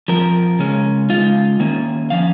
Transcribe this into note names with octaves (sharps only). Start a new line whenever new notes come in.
F2 F3 A#4
C#3 G#3 C#4
C#3 G#3 D#4 F4
D#3 A#3 C#4
F3 C#4 F5